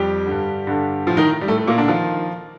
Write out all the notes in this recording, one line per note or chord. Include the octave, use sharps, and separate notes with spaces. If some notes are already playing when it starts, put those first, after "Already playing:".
Already playing: F2 G3 G4
D3
G2
G2 D3
A2 F3 F4
D#3 D#4
G3
A2 A3
A3
A#2 A#3
D3 D4
D#3 F3 F4